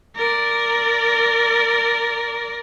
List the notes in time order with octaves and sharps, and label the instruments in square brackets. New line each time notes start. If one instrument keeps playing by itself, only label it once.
[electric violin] A#4 D5